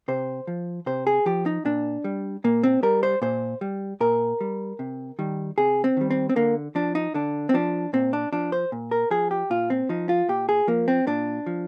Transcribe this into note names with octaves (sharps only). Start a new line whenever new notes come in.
C3 C5
F3
C3 C5
G#4
F3 G4
D#4
A#2 D4
G3
A#2 A#3
C4
G3 A#4
C5
A#2 C5
G3
A#2 A#4
G3
C3
D#3 G3
C3 G#4
C4
D#3 G3
C4
C4
D3 A#3
F3 D4
D#4
D3 D4
C4
F3 D4
A#2 C4
D4
F3 D4
C5
A#2
A#4
F3 G#4
G4
A#2 F4
C4
F3 D#4
F4
A#2 G4
G#4
F3 A#3
C4
A#2 D4
F3